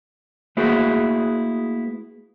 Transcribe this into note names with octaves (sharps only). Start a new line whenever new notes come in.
A3 A#3 E4 F#4 G#4 B4